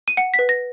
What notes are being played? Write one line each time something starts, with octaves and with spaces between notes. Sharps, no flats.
D#7
F#5 C#7
B6
B4
A#6